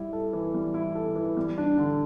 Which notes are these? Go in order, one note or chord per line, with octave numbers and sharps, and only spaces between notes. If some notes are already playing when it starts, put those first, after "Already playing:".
Already playing: G3 E4
A4
E3
G3
E4
A4
E3
G3
D4
D3